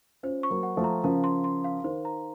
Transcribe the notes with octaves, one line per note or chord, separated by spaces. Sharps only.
C#4 F4 C5
C#6
F#3 A#3
F#5
F3 A3
A#5
C#3 F3 A#4
C6
C6
F5
D#3 C5
A#5